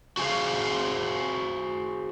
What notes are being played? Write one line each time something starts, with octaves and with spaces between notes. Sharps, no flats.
F#4 G#4 A#4 C5 F5